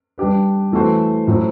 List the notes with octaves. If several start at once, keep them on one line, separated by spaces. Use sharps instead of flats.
G3 D4 G4 B4
E3 A3 C4 F#4 C5
A2 F#3 C4